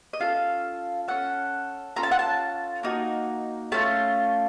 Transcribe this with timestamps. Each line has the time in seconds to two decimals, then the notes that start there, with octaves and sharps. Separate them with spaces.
0.13 D#5
0.20 C#4 F4 A4 F5
1.08 C#4 A4 F#5
1.96 C#4 F4 A4 A#5
2.03 A5
2.11 F#5
2.19 A5
2.83 A#3 D#4 F#4
3.72 A3 C#4 F4 A5